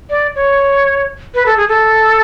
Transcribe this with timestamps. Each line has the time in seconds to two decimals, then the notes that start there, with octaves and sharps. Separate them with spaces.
0.10 D5
0.35 C#5
1.35 B4
1.46 A4
1.57 G#4
1.68 A4